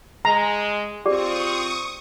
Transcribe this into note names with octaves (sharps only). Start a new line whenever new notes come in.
G#3 A#5
C4 F4 G4 G#4 D5 C#6 D#6